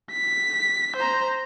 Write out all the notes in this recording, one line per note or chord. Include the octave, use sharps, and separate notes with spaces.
B6
C5 A#5